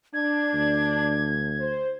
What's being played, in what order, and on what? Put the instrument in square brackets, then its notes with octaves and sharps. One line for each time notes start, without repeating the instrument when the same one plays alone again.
[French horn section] D4 [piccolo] G#6
[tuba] D2
[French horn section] C5